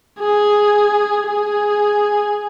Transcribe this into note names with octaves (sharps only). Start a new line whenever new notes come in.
G#4
G#4